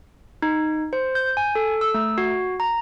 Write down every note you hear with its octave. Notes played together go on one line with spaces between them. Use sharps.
D#4
C5
G6
G#5
A4
E6
A3
F#4
A#5